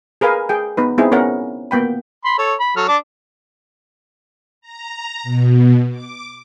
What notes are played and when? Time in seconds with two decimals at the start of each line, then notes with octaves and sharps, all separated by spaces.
0.21 G#4 A#4 B4 F5 G#5
0.49 G#4 G5
0.77 B3 D#4 B4
0.98 B3 C4 D#4 E4 G#4
1.12 B3 C#4 A#4 F#5
1.71 A#3 B3 G5 B5
2.25 B5 C6
2.38 A4 C#5
2.60 B5
2.76 F#3 A4 F6
2.88 D4 A5 D6
4.61 A#5
5.23 B2
5.90 D6